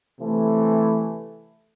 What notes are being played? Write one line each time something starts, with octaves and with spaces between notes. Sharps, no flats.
C3 E3 A3